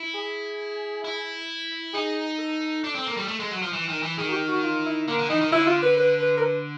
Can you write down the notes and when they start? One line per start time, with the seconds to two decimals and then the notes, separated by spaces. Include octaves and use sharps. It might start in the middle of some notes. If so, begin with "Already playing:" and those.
Already playing: E4
0.14 G#4
1.04 E4
1.94 D#4 G#4
2.38 A4
2.84 D4
2.95 C4
3.06 A#3
3.17 G3
3.28 A3
3.40 G#3
3.51 F#3
3.62 F3
3.73 E3
3.88 D#3
4.03 E3
4.18 D#3 G#4
4.28 F#4
4.32 G4
4.48 F#4
4.63 F4
4.86 E4
5.08 D3 A#3
5.19 D3
5.30 E3 D#4
5.41 D#3
5.52 D3 E4
5.67 F4
5.82 B4
5.97 B4
6.20 B4
6.37 A#4
6.42 B4